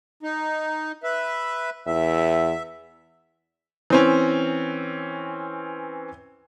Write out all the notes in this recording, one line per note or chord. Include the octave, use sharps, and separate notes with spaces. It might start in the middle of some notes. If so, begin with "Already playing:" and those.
D#4
B4 E5
E2 E5
E3 C4 C#4